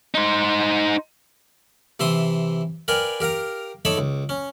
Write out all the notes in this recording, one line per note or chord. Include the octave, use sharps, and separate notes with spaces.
D#4 C5
C3 E3 E5 C6 D#6
A#4 B4 D5 F5 G5 G#5
G4 A#4 F5 A#5
D#4 A4 C#5 E5 B5 D6
C#2
C#4